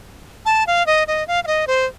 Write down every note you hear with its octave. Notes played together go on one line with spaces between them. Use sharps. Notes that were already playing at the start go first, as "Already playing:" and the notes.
A5
F5
D#5
D#5
F5
F5
D#5
C5